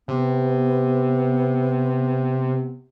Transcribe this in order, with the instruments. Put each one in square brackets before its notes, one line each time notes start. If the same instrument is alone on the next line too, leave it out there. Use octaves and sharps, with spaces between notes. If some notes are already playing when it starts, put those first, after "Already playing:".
[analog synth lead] C3 [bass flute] B3